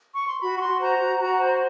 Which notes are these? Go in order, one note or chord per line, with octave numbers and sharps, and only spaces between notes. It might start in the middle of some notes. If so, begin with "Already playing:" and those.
C#6
C6
F#4 B5
C#6
F#4 C6
C5 A#5
F#4
F#4
C5